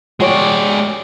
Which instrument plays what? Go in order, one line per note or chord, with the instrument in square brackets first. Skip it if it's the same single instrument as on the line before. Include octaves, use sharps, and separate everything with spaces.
[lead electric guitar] G#3 D5 [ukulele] F#4 G4 C#5